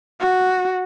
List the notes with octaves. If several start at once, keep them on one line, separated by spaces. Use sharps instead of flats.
F#4